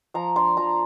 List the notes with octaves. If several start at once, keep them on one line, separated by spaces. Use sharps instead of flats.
F3 A#5
D4 C6
F3 A#5